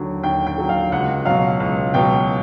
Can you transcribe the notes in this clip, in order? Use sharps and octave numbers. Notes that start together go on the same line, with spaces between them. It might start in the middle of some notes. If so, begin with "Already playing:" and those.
Already playing: D#2 D3 F#3
D#2 G5
G5
D3 F#3
F5
C#2 F#5
B2 F#3 F5
C#2
B2 F#3 G5